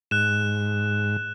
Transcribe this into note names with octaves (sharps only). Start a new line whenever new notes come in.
G#2 F#6 E7